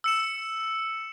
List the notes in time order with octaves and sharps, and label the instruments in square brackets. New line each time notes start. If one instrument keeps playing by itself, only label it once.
[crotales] E6 C#7 E7